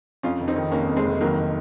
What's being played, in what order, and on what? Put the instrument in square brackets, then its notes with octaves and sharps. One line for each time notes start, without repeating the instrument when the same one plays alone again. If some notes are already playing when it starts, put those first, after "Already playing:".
[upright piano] F2 [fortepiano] C#4 F4
[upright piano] F1
[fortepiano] C4 D#4
[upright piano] D#3
[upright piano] F1 [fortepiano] A#3 C#4
[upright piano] F2
[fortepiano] G#3 C4
[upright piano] F1
[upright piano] D#3 [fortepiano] F#3 A#3